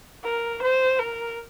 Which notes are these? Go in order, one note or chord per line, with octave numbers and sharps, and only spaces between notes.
A#4
C5
A#4